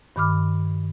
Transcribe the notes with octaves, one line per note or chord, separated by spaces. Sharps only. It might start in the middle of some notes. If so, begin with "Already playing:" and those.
G2 D#3 B5 D6 F6